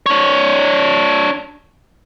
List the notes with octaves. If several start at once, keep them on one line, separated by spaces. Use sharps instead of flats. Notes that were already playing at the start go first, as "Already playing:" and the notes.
D4 C#5